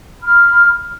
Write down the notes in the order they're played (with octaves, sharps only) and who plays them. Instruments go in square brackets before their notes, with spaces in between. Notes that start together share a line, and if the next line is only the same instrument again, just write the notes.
[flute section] B5 F6